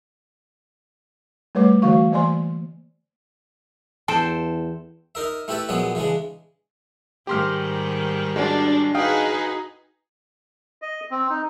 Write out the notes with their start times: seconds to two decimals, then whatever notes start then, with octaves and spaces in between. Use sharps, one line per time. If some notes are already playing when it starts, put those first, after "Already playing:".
1.55 G3 A3 B4 C#5 F#5 D6
1.82 D3 E3 A3 F#4 F5 C#6
2.12 E3 A#3 C5 D5 G#5 C6
4.08 E2 A4 C5 G5 A5
5.15 D#4 A#4 E5
5.48 A3 E4 G4 B4 E5 A5
5.69 A#1 F#3 G#3 B3 C#5
5.95 C#3 E3 G#3 D4
7.27 G#2 D#3 G3 G4 C6 F6
8.36 G#3 D4 F#4
8.95 D#4 F#4 G#4 B4 F5 G5 D#6
10.82 D#5
11.11 C4
11.30 D#4